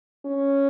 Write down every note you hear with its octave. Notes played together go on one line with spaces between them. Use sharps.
C#4